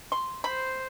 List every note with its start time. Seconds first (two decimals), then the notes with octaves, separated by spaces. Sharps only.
0.12 C6
0.44 C5 B5